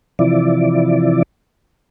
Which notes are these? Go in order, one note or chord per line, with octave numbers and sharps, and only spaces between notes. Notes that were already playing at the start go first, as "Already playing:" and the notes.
C3 E3 F3 E4 D5